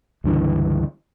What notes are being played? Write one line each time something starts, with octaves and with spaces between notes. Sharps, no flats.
C#2 G2 D3 E3